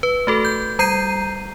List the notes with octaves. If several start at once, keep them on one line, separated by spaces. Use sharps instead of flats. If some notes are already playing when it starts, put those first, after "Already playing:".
B4
A3 F#4 A4
G6
G3 A#5 G6 C7 D#7